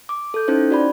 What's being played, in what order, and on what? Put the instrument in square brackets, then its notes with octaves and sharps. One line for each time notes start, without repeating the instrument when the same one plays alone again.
[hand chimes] D6
A4 G6
C#4 D#4 E4 C5
F#4 D5 B5